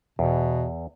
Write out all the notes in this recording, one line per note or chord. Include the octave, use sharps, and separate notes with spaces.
E2 B2